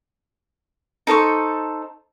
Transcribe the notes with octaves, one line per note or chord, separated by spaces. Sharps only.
D#4 A4 C5 C#6